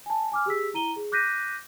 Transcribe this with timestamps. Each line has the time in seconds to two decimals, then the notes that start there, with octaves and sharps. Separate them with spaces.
0.06 G#5 A5
0.32 G#5 D6 F6
0.46 G4 G#4 E6 B6
0.74 E4 A#5 D#7 G7
0.96 G#4
1.12 D6 F#6 G6 A#6 B6 D#7